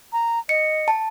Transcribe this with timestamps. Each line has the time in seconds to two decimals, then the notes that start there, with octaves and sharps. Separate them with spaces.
0.13 A#5
0.49 D#5 C#7
0.88 A5